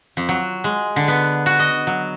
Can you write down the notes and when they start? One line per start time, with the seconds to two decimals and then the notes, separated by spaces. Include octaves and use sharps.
0.17 F2
0.29 F#3
0.64 G#3
0.96 D3
1.08 B3
1.46 F#4
1.59 D#5
1.87 F#3